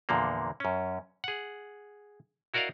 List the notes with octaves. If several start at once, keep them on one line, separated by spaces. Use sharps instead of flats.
E2 A#2 D3 F3 A#3
F#2 C#4
G#4 F#5
E4 F#4 A#4 D5 D#5 F5